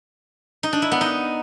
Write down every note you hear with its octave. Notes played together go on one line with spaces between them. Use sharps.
D#4
D4
E4
B3
D#4